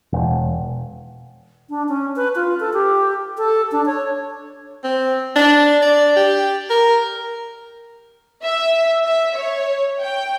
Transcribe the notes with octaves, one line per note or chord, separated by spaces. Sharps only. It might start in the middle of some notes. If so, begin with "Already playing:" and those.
E1
D4
C#4
B4
F4
A4
G4
A4
D4
C#5
C4
D4
D5
G4
A#4
E5
E5
C#5
G5